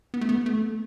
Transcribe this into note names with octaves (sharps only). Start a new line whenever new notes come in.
B3
A3
B3
A3